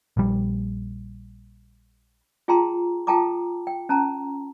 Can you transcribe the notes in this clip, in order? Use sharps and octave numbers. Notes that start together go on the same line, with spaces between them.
A#1 G3
F4 G#4 G5 A5 A#5 C6
F4 A4 G5 A5 A#5 D6
G5
C#4 A5 A#5